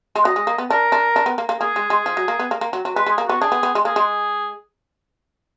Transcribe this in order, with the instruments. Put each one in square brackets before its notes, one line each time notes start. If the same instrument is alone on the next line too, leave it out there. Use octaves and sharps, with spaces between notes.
[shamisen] G#3
[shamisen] F#3 [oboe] D#5
[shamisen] G#3
A#3
B3
[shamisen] D4 [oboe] A#4
[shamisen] D4
D4
B3
A#3
A#3
[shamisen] A#3 [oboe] G#4
[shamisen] G#3
G#3
F3
F#3
A#3
B3
A#3
A#3
F#3
F#3
[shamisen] G#3 [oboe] B4
[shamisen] G#3
[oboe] G#4
[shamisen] A#3
[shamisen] B3 [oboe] F#4
[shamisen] D4 [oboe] G#4
[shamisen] B3
B3
G#3
[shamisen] A#3 [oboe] G#4
[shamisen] G#3